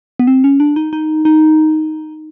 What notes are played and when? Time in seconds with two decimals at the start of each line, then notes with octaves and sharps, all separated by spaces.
0.20 B3
0.27 C4
0.44 C#4
0.60 D4
0.76 D#4
0.93 D#4
1.25 D#4